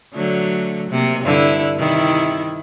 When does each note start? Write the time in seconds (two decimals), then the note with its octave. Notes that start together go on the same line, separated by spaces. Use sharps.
0.15 D3 F#3 A3
0.91 C3 A#3
1.24 G2 D3 E4
1.77 C3 D#3 E4